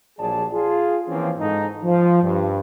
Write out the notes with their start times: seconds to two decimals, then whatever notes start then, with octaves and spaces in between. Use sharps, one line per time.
0.19 A#1 F#3 G3 G#4 D5 A5
0.52 F4 G#4
1.08 E3 F3 A#3 C4 C#4 F4
1.38 G#2 D#4 A4
1.84 F3
2.23 G2